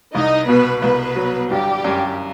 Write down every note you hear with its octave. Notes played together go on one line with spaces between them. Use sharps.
C2 D#4 D#5
B2 B3 B4
C2 B3 B4
F#3
G1 G3 G4
F#2